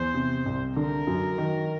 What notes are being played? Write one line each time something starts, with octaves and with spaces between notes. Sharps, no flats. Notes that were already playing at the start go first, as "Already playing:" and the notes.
Already playing: E2 C5
C3
C2
D3 A#4
F#2
D#3